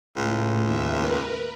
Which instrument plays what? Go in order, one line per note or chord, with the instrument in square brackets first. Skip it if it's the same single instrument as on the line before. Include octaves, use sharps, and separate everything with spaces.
[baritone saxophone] C#2 [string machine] A2
[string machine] D#2 E5
A#4 B4